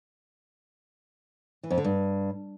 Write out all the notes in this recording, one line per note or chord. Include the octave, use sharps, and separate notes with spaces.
E3
F2
D3
G2